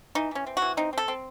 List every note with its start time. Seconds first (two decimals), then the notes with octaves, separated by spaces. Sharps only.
0.15 E3 D#4
0.31 E3 C#4
0.47 C4
0.57 F#4
0.62 E3
0.77 C4 D#4
0.93 C4 A4
1.08 C4